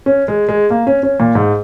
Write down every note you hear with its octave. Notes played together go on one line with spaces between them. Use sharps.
C#4
G#3
G#3
A#3
C#4
C#4
A#2
G#2